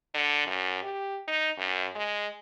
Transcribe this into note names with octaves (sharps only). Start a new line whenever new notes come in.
D3
F#2
G4
D#4
F#2
G#3